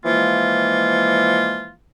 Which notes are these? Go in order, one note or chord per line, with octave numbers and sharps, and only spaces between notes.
E3 F3 G#3 A#3 F4